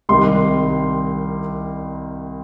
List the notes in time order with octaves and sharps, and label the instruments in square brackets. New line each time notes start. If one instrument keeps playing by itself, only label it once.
[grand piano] C2 C3 D#3 G3 C6